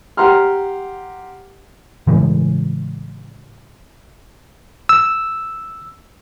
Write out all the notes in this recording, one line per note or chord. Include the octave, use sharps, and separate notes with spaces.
G4 F#5 A#5 C6 F6
A2 C#3 E3 G#3
E6